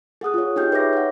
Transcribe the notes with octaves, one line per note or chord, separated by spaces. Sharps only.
G#4 F#5 D#6 F#6
F4 C#5
D#4 G4 G#4 G5 G6
B4 C#5 E5 D6 A#6
C#5 F#5